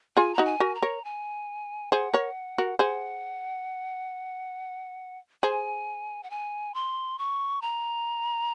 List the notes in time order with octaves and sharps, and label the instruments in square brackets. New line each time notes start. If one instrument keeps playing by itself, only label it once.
[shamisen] F4 G#4 [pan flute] G#5
[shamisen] D#4 F#4 [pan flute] A#5
[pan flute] G#5
[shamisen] F#4 A#4
[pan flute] A#5
[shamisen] A#4 C#5
[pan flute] G#5
[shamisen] G#4 C5 [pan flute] F#5
[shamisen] A#4 C#5
F#4 A#4
[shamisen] G#4 C5 [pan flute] F#5
[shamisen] G#4 C5 [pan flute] G#5
[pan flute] F#5
G#5
C6
C#6
A#5